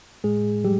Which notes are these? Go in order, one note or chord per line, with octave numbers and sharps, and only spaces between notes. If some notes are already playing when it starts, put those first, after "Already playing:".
A2 G#3 G#4
F#3 G3 G4